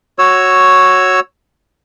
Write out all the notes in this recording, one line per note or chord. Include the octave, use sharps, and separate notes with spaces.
F#4 C#5 E6